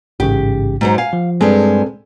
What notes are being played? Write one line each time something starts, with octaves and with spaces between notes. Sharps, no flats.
A1 G#2 C#3 G4
G#2 F#3 C5
F5 G#5
F3
G2 G#3 C4 G#4 A4